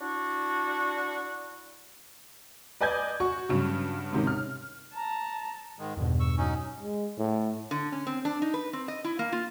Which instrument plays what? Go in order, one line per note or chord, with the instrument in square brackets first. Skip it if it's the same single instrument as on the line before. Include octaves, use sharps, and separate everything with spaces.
[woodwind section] D4 E4 F#4
[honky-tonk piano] B4 D5 D#5 G#5 G6 G#6
F#4 C#6
G2 C#3 F#3
G#2 C3 D#3 C#4
F6
[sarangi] A5 [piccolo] A#5
[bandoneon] G#2 D#3 G#3
[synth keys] E2 G2 B2 [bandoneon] D3
[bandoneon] C#6 E6
F#3 C#4 D#4
[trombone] G#3
A2
[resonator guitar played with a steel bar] D3
C#4
C4
D4
D#4
B4
C4
D#5
E4
A#3
F4